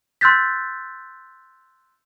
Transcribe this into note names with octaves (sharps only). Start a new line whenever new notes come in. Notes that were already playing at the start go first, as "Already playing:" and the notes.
C6 E6 F#6 G6 A6 B6